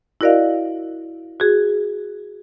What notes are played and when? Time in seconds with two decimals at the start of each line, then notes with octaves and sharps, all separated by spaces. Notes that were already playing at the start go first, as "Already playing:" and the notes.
0.21 E4 F#4 A#4 D5 D#5 F5
1.40 F#4 G#4